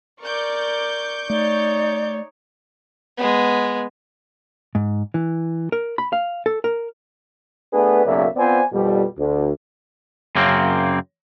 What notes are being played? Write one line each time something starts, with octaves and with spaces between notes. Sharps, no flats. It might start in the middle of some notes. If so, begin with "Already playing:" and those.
A#4 D5 C#6 D6 G6
A3 D#4 C#5 D5
G#3 B3
G#2
E3
A#4
B5
F5
A4
A#4
A3 B3 D4 G#4 B4
B1 F#2 C#3 A#3 D5 E5
B3 C4 F4 C5 D5 G#5
F2 B2 G3
D2
F#2 C#3 A#3 C4